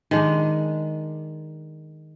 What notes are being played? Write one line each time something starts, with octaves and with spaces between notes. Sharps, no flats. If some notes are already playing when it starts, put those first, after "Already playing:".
D#3 G#3 D4